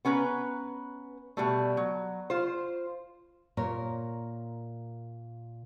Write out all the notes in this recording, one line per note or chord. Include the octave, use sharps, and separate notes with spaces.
B3 C#4 B4 A#5
B2 G3 A3
F#3
F4 C5
A#2 A#4 C#5